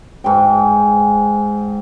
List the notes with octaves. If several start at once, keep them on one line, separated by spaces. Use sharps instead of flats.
G#2 G5